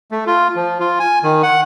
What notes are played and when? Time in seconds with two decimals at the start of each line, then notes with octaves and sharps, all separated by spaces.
0.11 A3
0.27 F4
0.56 F3
0.80 F4
1.00 G#5
1.23 D#3
1.43 F#5